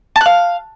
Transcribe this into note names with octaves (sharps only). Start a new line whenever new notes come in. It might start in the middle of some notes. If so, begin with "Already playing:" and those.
A5
F#6
F5